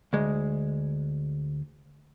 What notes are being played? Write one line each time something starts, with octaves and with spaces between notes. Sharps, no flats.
D2 G#3